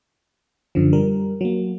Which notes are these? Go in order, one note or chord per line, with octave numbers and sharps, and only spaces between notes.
F#2 D3 F3
G3 A#4
F#3 A#3